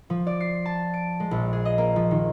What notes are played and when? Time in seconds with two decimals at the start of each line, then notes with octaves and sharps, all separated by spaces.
0.10 F3
0.27 D5
0.41 C7
0.65 A5
0.94 D7
1.20 G#3
1.31 A#1
1.53 G#4
1.65 D#5
1.78 A#3
1.96 F3
2.11 D#3